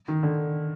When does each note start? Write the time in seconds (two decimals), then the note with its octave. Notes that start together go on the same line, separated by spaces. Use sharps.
0.08 D#3
0.23 D3